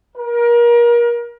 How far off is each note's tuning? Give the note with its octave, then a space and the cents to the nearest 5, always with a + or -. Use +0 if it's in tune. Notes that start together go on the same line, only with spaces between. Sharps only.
A#4 +30